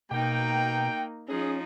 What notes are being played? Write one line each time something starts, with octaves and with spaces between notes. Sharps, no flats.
B2 A#3 D#4 G5
F3 C#4 D#4 G#4